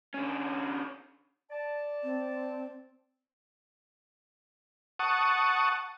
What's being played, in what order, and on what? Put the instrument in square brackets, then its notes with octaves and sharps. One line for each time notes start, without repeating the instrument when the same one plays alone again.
[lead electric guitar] D3 C#4
[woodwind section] D5 A5
[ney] C4
[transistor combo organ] F#5 A5 C#6 D#6